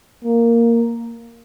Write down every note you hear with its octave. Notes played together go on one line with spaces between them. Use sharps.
A#3